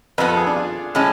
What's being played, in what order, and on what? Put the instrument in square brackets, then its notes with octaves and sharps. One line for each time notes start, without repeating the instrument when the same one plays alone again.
[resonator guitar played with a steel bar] F2 F3 B3 [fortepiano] B4
[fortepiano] A4
G#4
D4
F4
[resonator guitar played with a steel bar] A2 F3 G#3 C#4